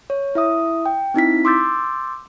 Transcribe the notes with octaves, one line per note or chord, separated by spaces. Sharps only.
C#5
E4 E5 D#6
G5
C4 D#4 E4 B6
C6 D6 E6 G6 A6